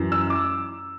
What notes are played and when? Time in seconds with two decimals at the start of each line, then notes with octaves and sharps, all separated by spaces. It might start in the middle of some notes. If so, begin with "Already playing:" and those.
Already playing: F#2 E3
0.12 E6
0.30 D6